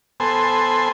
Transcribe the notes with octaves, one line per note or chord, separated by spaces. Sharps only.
B3 A4 C5 G#5